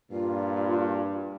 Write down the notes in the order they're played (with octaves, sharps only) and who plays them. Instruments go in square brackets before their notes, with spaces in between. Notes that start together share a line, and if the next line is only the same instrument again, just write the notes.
[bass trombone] G2 [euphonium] A#2 [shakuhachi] F4